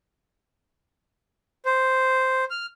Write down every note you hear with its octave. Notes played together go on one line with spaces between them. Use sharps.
C5
F6